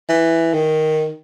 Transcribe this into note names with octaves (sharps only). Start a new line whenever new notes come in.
E3
D#3